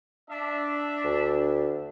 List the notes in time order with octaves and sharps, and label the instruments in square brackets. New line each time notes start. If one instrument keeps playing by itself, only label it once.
[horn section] D4 E5
[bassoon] D2